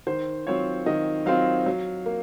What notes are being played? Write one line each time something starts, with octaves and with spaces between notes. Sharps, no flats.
D#3 C5
F#3 C4 F4 C#5
D#3 D#5
F#3 C4 F4 F5
F#3
A#3